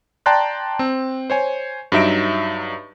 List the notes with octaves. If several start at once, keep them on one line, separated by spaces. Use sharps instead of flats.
D5 G5 A5 A#5 C6 F#6
C4
C5 C#5 G#5
G2 F#3 D#4 E5 A#6 D7